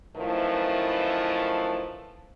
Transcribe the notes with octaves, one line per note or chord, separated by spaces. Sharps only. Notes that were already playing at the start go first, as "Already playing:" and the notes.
F#2 D#3 F3 A3 E4 B4